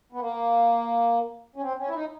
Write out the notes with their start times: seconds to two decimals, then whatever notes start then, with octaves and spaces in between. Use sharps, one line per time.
0.12 B3
0.20 A#3
1.56 C#4
1.62 C4
1.78 C#4
1.88 E4
1.94 D#4